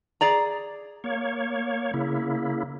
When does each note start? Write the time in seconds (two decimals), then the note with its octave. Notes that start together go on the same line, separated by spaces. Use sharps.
0.21 G#4 D5 A#5
1.04 A#3 C#5
1.94 C#3 A#3 E4